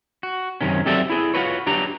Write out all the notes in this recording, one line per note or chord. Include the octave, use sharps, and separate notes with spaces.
F#4
F#2 C3 D#3 C#4
F#3 C4 G4 A4 D5 E5
E4 G#4
F4 F#4 G#4 A4 B4 C#5
F#3 D4 G4 A#5